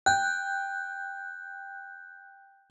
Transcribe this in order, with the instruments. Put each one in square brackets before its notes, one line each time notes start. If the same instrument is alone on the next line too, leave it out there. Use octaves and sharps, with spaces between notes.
[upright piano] G5 [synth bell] F#6 G6